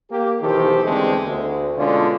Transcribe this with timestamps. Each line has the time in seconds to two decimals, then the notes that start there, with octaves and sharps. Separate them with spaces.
0.11 A#3 G4
0.42 B1 D#3 E3 G4 A4 C5
0.85 E2 D3 D#3 G#3 A3 C4
1.25 D2
1.77 B2 D3 G#3 C#4 D4 F4